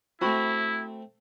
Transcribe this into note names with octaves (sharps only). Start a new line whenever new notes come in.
A3 C4 E4 F#4 B5